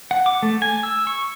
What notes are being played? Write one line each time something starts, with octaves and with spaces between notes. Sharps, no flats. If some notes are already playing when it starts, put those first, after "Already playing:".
F#5
D6
A3
G#5
E6
C#6